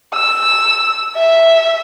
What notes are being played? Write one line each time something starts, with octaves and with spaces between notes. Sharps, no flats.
E6
E5